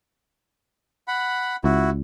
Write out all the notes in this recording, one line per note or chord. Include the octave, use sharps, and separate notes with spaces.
F#5 B5
C#2 E4 F#4